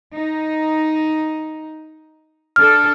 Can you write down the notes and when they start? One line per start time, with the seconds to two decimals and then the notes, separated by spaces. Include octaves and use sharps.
0.14 D#4
2.56 D4 A4 F6